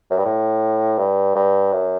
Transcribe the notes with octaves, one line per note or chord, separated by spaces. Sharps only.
F#2
G2
A2
G2
G2
F#2